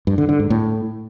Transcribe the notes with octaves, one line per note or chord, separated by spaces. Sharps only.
G2
D3
D3
G#2
A2